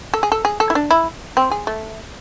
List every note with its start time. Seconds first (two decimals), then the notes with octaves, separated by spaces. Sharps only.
0.14 A4
0.23 G#4
0.32 A4
0.45 G#4
0.60 A4
0.70 E4
0.75 D4
0.91 E4
1.37 C4
1.51 G#4
1.67 A3